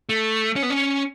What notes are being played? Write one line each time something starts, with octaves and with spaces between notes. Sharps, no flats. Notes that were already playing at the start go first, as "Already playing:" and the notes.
A3
C#4
B3
C#4